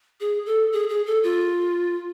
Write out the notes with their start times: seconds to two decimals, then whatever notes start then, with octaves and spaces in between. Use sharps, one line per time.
0.20 G#4
0.46 A4
0.72 G#4
0.89 G#4
1.06 A4
1.24 F4